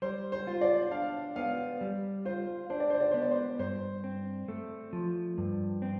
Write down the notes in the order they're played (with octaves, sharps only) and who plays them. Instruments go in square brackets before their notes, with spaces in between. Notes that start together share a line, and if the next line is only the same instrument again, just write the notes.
[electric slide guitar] G3 [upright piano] C5
[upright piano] C5
[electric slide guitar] F4
[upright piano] D5
[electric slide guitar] D4 [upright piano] F5
[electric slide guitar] B3 [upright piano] F5
[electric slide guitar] G3
[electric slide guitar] F4 [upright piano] C5
[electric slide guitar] D4 [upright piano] C5
[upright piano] D5
C5
D5
[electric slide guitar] B3 [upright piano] C5
[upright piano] D5
C5
[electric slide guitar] G2 [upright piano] C5
[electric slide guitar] C4
A3
F3
G2
C4